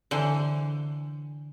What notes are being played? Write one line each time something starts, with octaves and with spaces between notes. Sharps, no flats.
D3 E3 C5